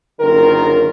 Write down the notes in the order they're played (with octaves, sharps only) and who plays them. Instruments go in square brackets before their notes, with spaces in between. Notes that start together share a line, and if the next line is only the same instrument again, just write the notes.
[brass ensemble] F#1 D3 D#3 F4 A#4